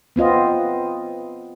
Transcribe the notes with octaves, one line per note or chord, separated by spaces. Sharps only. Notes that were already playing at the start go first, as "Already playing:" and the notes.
B3 C4 F4 D#5